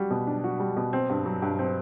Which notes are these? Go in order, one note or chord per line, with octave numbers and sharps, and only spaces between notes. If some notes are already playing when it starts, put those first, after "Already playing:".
Already playing: G3 F#4
B2
D4
F#4
G3
B2
C4
G2
F#3
G2
C4